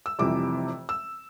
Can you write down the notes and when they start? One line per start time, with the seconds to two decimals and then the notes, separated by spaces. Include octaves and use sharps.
0.06 E6
0.19 F1 F2 C3 E3 G3 D6
0.89 E6